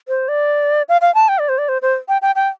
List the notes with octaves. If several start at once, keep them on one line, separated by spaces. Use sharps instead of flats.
C5
D5
F5
F5
A5
G5
D5
C5
D5
C5
C5
G5
G5
G5